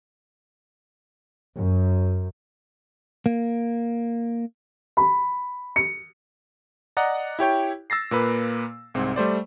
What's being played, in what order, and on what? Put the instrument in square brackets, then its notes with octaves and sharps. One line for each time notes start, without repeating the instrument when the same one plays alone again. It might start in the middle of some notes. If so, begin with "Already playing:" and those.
[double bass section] F#2
[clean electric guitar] A#3
[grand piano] B5
C#7
[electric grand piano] D5 D#5 F#5 A#5
E4 G4 C#5 G5
E6 A6 A#6 C7
A#2 A#3 B4
C2 G#2 C4
G3 A3 C5 D5